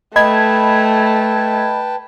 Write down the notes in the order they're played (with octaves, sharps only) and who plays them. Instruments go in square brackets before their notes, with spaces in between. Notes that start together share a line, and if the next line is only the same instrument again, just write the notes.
[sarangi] A3 [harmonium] B4 G5 A5 [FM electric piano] D#5 B5 G#6